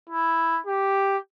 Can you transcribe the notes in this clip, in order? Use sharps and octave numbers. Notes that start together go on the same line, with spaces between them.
E4
G4